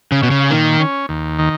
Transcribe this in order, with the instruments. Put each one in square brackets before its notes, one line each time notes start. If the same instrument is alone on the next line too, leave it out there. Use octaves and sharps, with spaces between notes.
[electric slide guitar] C#3
[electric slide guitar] B2 [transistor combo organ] C#4
[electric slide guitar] C#3
[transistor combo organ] A#2 [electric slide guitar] D#3
[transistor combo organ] C#4
D#2
D#3